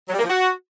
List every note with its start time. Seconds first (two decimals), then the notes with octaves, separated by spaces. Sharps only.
0.08 F#3
0.14 G3
0.19 A#3
0.24 F3
0.29 F#4